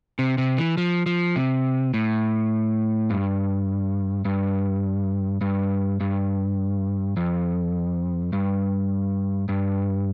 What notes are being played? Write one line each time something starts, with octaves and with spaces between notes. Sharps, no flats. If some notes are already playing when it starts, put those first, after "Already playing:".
C3
C3
E3
F3
F3
C3
A2
G2
G2
G2
G2
F2
G2
G2